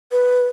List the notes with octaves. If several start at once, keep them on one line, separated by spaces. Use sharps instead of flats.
B4